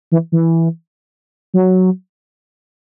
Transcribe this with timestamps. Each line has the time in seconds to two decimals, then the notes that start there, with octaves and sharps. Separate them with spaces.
0.12 E3
0.32 E3
1.54 F#3